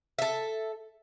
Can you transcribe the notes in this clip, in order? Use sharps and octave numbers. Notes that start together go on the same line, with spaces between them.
A4 E5